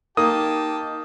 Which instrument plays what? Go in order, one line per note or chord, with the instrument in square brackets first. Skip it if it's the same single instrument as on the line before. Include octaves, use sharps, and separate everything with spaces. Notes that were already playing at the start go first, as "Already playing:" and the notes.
[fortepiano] A#3 [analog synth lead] D#4 [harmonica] G4 A5 [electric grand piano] D#6